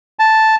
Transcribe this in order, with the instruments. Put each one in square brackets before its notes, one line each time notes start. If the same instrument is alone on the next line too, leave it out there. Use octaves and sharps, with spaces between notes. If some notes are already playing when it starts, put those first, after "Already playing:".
[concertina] A5